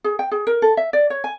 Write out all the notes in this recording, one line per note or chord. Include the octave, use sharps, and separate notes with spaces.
G#4
G5
G#4
A#4
A4
E5
D5
C#5
G#5